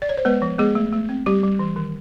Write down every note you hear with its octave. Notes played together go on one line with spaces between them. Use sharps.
D5
C#5
C5
G#3 B3 B4
F3
G#3 B3 G#4
A3
A3
C4
G3 G4
G3
E3
D#3